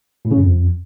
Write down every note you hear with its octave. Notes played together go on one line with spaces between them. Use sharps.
A2
C#3
F#2
F2